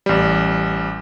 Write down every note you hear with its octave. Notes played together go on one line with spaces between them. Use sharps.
A1 G3